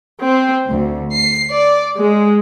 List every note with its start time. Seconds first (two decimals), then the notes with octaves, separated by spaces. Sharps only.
0.22 C4
0.68 D2
1.15 C7
1.52 D5
1.97 G#3